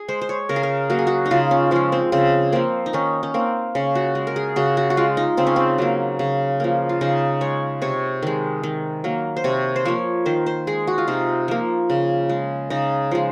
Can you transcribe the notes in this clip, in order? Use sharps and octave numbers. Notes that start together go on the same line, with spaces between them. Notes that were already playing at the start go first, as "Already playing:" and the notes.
Already playing: G#4
G#3 C5
C5
C#5
C#3 A#4
G#4
A#4
F#3 A#3 F#4
G#4
F#4
D#4
C#3 F4
C#4
F3 G#3 C#4
C4
C#3 C4
F3 A#3 C4
D#4
D#3 C#4
C#4
A#3 C4
C#3 C#4
F#4
G#3
A#4
G#4
C#3 F#4
F#4
F#4
G#3 F4
D#4
C#3 C4
C#4
C4
F#3 A#3
C#3
F3 A#3
F4
C#3 D#4
G#3 C#5
C3 C#5
D#3 G#3
D#3
F#3 A#3
C5
C3 C#5
C5
F3 A#3 C#5
D#3 C5
C5
G#3 G#4
F#4
F4
C3 D#4
F3 A#3
C#3
G#3
C#3 D#4
F3 G#3